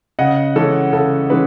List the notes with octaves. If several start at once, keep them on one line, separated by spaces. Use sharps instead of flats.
C#3 D#5 F#5
E3 G#3 C#4 A4
C#3 A4
E3 G#3 C#4 B4